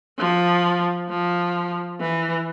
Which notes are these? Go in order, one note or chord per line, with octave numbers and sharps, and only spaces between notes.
F3
F3
E3